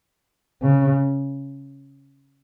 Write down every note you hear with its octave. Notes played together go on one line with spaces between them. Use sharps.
C#3